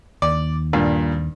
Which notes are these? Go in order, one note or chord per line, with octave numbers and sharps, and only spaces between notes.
D#2 D5
G2 A#2